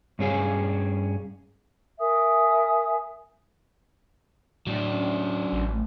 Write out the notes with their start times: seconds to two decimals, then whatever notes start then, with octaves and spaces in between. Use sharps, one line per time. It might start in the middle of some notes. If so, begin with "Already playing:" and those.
0.19 G2 C#4 G#4 F5
1.99 A#4 E5 G#5 D#6
4.67 A2 F#3 D4
4.90 C#4
5.53 A1
5.72 A3